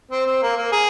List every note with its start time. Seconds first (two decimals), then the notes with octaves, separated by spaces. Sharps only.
0.11 C4
0.27 C4
0.42 A#3
0.57 A#3
0.72 G#4